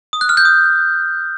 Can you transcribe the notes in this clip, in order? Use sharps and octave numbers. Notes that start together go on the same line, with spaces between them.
D#6
F#6
F6
G6
D#6